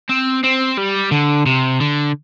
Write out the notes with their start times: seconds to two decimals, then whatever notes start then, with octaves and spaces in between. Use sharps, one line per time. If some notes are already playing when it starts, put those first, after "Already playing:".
0.09 C4
0.44 C4
0.77 G3
1.11 D3
1.46 C3
1.80 D3